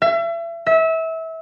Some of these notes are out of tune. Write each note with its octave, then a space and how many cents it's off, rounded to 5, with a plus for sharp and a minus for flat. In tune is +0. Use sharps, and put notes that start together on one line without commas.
E5 +35
E5 -25